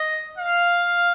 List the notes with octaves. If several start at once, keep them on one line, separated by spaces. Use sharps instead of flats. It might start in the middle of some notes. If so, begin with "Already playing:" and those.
Already playing: D#5
F5